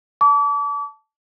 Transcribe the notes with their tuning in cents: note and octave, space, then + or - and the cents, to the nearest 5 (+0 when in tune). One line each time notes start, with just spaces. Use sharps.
A5 -10 D6 -35